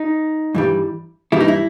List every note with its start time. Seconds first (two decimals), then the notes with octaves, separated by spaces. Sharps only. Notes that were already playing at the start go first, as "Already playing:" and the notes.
Already playing: D#4
0.55 G2 E3 G3
1.32 G2 E3 G3 E4
1.40 D#4
1.48 E4